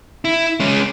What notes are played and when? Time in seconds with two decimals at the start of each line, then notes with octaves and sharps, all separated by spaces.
0.25 E4
0.60 G#3 C#4